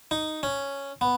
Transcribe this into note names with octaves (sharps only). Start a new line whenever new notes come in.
D#4
C#4
B3